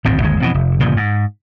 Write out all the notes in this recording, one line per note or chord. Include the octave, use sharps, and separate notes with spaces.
D1 G#1 G#2 C4
G1 D#2 D#3 G#3
F2 B2 E3
F1
G1 A#2 C#3 F3
G#2